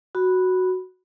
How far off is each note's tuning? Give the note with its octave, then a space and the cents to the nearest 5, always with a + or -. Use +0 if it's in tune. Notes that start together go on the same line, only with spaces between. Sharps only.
F#4 +0 B5 +0